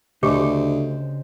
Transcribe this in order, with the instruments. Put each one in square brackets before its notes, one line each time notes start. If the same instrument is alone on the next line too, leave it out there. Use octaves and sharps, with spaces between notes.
[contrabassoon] D2 [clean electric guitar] C#3 C5 D#5 [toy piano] G4 D6